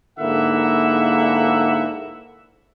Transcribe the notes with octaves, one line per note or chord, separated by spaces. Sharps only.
G#2 D3 A#3 E4 E5 F#5